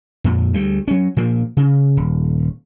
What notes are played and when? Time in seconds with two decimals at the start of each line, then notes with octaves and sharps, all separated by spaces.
0.24 F2 A#2
0.53 D2 G3 A3
0.88 F#3 C#4
1.17 A#2 F3 A#3
1.57 C#3
1.97 D#1